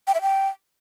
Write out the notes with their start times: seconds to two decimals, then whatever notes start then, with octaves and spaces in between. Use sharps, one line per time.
0.07 G5
0.14 E5
0.22 G5